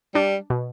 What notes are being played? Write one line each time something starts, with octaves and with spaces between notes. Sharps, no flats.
G3 D4
B2